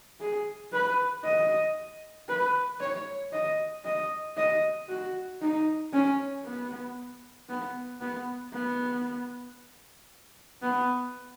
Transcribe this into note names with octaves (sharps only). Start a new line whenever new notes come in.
G#4
B4
D#5
B4
C#5
D#5
D#5
D#5
F#4
D#4
C#4
B3
B3
B3
B3
B3